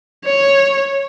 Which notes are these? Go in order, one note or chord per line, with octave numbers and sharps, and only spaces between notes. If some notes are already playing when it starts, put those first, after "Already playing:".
C#5